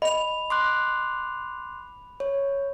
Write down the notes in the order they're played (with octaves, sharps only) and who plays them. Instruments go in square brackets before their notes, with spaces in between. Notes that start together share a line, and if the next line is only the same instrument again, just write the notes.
[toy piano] D#5 [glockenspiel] B5 F7
[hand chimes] C6 D6 F#6
C#5